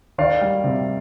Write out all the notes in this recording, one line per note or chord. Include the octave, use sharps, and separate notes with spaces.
D#3 D5 F5
G3
C3